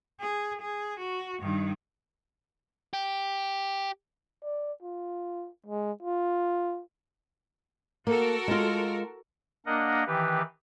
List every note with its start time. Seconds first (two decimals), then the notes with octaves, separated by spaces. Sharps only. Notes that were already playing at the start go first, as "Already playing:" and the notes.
0.20 G#4
0.61 G#4
1.00 F#4
1.41 G2 D#3
2.93 G4
4.43 D5
4.83 F4
5.67 G#3
6.03 F4
8.07 A#3 F#4 A4 A#4
8.48 G#3 F4
9.66 A#3 D4 A#4 D#5 F#5
10.07 D#3 E3 G4 B4